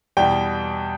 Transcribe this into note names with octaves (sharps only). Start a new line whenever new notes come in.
E2 B2 G3 G5